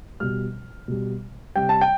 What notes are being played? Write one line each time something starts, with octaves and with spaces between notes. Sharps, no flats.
B2 G3 F6
B2 G3
C3 G3 G5
A5
G5